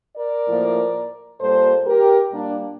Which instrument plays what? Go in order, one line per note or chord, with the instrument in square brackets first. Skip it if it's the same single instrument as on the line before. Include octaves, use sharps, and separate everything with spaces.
[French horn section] A#4 D5
A2 F3 A#3
A#2 G3 A#3 A4 C5
G4 A#4
A#2 G3 A#3 D4